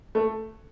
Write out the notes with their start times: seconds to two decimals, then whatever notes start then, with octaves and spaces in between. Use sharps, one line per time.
0.15 A3